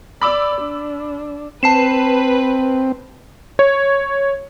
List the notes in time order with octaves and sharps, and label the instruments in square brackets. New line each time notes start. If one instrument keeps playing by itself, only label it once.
[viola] D5 [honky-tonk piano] B5 D6 E6
[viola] D4
[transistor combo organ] C4 [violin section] B4 [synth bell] A5 C7 E7
[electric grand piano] C#5